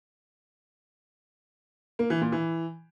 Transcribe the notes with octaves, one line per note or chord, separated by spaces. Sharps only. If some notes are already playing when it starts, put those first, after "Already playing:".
A#3
E3
A#2
E3